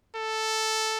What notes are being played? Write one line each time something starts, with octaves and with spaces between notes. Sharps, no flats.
A4